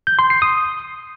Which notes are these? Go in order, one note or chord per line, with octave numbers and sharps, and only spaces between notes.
G6
C6
C7
D#6